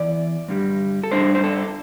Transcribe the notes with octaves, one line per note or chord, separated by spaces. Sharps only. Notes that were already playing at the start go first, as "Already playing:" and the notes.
Already playing: E2 E3 D5
G2 D3 G3
A4
G2 G3 D4 C5
C5
A4